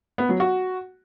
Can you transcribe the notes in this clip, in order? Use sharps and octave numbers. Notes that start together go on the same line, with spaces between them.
B3
F#3
F#4